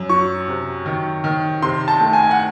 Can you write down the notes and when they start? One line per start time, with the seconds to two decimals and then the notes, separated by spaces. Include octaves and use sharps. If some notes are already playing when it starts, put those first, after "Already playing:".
Already playing: F#2
0.09 F#3 C#6
0.48 C3
0.86 D#3
1.24 D#3
1.62 C3 C6
1.88 A5
2.00 A3
2.13 G#5
2.23 G#5
2.31 F#5